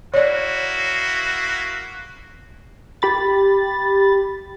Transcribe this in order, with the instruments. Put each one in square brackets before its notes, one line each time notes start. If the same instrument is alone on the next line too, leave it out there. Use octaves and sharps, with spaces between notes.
[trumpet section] A#3 E4 F#4 [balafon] C#5 D5
[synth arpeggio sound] G4 B5 A6